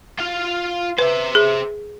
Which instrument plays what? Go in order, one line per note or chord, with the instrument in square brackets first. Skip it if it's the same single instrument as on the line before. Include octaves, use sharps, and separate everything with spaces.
[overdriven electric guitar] F4 F5
[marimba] B4 [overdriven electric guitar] C5 E5
[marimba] G#4